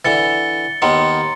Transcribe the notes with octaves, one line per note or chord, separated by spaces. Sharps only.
D3 E3 A6 C#7 G7
D#2 D#3 B3 A#5 C6 C#7